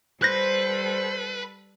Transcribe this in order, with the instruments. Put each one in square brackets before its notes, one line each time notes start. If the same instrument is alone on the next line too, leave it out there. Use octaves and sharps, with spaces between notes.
[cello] G3 A4 [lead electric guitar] B4 [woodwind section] C5 [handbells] F#6 G6 A#6